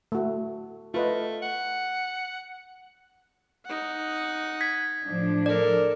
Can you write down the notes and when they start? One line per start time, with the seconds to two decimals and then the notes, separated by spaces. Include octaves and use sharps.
0.12 A3 F#4
0.94 A3 F4 B4 D#5
1.42 F#5
3.65 D#4 F#5
4.61 G#6 B6
5.04 A2 F3 D4
5.46 A4 A#4 D5